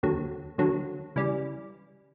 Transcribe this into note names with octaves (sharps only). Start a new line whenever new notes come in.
D#2 D3 F#3
D#2 D3 F#3
C#3 E3 G3